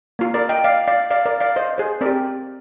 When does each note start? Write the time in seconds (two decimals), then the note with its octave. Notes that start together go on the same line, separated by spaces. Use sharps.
0.19 A#3 F4
0.34 A#4 D5
0.49 D#5 G5
0.64 D5 F5
0.88 D5 F5
1.11 D5 F5
1.25 A#4 D5
1.41 D5 F5
1.56 C5 D#5
1.78 G#4 C5
2.01 C4 G4 A#4 D5